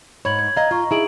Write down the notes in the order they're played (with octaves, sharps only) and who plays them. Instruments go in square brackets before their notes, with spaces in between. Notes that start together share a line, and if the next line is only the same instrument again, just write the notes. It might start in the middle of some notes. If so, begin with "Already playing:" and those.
[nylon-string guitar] G#2 C#5 [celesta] B5 G#6 F#7
[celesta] G#6
[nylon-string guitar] D#5 F5 [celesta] A#5 G#6
[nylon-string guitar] F4 [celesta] A#5 C#6
[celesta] D#4 D7 F#7 [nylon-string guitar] E4 G#4